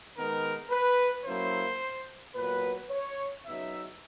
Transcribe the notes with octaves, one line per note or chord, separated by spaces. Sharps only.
D#3 G#3 B3 D#4 A#4
B4
F#3 A#3 C#4 E4 C5
A#2 F#3 B3 B4
C#5
C#3 F#3 B3 D#4 E5